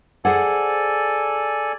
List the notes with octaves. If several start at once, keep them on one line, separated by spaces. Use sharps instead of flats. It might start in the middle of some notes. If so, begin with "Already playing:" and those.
G#4 A4 C5 D5 F#5 G#5